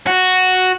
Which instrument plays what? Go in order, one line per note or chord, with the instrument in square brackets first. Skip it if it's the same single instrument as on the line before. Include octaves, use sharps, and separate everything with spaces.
[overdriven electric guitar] F#4